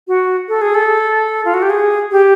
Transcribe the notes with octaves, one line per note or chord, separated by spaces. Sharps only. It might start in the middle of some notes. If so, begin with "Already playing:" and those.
F#4
A4
G#4
A4
F4
F#4
G4
G#4
G4